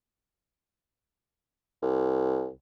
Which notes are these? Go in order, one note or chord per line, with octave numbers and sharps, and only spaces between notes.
C2